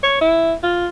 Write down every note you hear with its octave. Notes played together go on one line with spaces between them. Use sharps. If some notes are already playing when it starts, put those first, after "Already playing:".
C#5
E4
F4